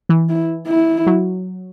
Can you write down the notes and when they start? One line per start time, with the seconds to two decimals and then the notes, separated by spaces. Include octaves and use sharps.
0.09 E3
0.29 E4
0.68 E4
1.06 F#3